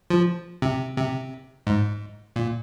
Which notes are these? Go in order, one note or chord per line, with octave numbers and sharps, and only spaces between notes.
F3
C3
C3
G#2
A#2